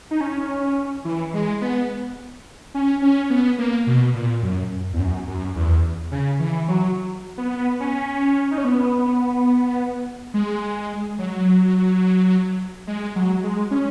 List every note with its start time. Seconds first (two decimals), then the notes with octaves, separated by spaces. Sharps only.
0.11 D#4
0.21 C#4
1.05 E3
1.33 G#3
1.61 B3
2.74 C#4
3.02 C#4
3.30 B3
3.58 A#3
3.87 B2
4.15 A#2
4.43 F#2
4.93 E2
5.00 F#2
5.28 F#2
5.56 E2
6.12 C#3
6.40 E3
6.68 F#3
7.38 B3
7.80 C#4
8.51 D#4
8.58 C#4
8.65 B3
10.34 G#3
11.18 F#3
12.87 G#3
13.16 F#3
13.44 G#3
13.71 C#4